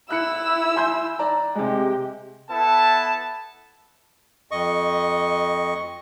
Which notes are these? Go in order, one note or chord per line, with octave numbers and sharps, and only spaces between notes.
E4 E6 F#6 C#7
G#5 C6 G6
D5 A#5
C3 G#3 G4
B3 E4 A4 A5
F2 D#5 C#6